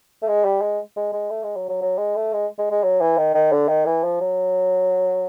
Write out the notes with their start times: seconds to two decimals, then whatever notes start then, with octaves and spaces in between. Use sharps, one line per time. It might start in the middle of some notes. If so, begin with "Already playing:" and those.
0.22 A3
0.28 G#3
0.45 G3
0.62 G#3
0.96 G#3
1.13 G#3
1.30 A3
1.44 G#3
1.56 F#3
1.69 F#3
1.82 F#3
1.98 G#3
2.16 A3
2.33 G#3
2.58 G#3
2.71 G#3
2.83 F#3
3.01 E3
3.17 D#3
3.34 D#3
3.52 D3
3.69 D#3
3.86 E3
4.04 F3
4.21 F#3